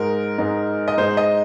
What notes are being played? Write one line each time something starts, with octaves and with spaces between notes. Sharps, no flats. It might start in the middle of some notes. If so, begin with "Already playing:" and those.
Already playing: G#2 G#3 D#4 A#4
G#2 G#3 D#4
D#5
G#2 G#3 D#4 C5
D#5